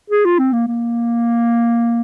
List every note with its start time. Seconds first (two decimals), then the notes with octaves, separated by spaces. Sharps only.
0.10 G#4
0.25 F4
0.39 C4
0.53 A#3
0.67 A#3